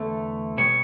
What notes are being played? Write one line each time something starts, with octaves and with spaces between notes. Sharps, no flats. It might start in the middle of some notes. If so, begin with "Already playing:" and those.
Already playing: E2 D3 A3
B2 G3 B3 C#5